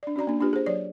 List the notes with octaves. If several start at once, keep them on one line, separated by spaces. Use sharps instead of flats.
D4 D5
C#4 F#4 D5 A#5
A#3 D4
A#3 D4 F4 G4 B4
G#4 C5
F#3 C#5 D5